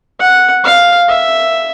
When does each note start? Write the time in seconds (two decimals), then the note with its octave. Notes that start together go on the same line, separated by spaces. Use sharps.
0.19 F#5
0.64 F5
1.08 E5